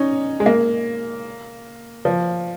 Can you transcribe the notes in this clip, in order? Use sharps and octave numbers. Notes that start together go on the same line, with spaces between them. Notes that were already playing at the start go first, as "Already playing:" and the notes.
Already playing: C#4 D#4
G#3
A#3
F3